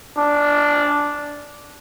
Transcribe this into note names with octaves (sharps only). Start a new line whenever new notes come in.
D4